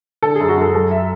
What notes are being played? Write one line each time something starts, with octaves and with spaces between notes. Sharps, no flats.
D3 A4
F#2 G#4
F#4
F#2 A4
F#3 A4
E5